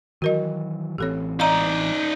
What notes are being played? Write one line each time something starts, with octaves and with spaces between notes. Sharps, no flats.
D#3 E3 F#3 F#4 A#4 D#5
A1 E3 C4 G4 A4 C#5
D#4 D5 D#5 F5 A#5